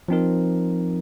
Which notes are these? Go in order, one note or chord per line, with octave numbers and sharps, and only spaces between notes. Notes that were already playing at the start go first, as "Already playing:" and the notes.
F3 C4 D#4 A#4